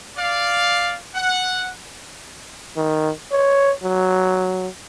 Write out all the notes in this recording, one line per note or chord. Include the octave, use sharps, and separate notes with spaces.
D5 F5
F#5
D#3
C#5
F#3